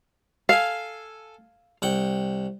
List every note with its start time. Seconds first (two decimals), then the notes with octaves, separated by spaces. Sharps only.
0.49 A4 F5 G#5
1.82 C2 F#5 G5